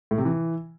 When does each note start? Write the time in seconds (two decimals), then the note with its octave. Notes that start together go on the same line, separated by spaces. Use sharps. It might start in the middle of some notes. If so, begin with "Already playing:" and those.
0.11 A2
0.18 C3
0.25 E3